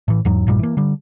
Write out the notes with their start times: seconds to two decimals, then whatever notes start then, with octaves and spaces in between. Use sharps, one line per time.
0.08 A2 E3
0.25 E2 G#2 F#3
0.47 A#1 G2 A#2 G3
0.59 E3 A#3
0.77 D3 G3